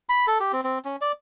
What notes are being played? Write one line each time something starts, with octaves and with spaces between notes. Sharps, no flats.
B5
A4
G4
C4
C4
C#4
D5